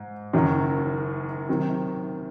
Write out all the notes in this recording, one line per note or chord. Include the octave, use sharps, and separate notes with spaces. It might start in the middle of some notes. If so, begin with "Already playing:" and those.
Already playing: G#2
F#1 F#2 D#3 F#3
C3 D#3 F#3